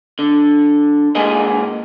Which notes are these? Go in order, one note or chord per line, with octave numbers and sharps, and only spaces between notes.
D3
G#2 A#3 G#4 D#5